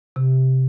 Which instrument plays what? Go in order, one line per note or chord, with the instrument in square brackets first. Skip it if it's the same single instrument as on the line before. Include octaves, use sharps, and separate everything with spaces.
[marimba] C3